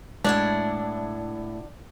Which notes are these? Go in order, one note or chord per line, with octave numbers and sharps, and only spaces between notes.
A2 G#3 D4 E4 F#5